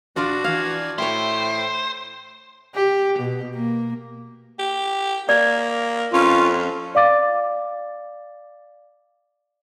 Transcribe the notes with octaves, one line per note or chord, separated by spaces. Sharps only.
A#1 D4 F4 F#4 D5
E3 D5 F5 G#6
A2 C5 C#5 E5 G5 C6
G4
B2
A#3
G4
A#3 D5
F2 C#4 F4
D5 F5 D6 A6